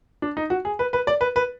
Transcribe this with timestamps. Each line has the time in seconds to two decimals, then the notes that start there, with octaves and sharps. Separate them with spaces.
0.22 D4
0.37 D#4
0.50 F#4
0.65 G#4
0.79 B4
0.93 B4
1.07 D5
1.21 B4
1.36 B4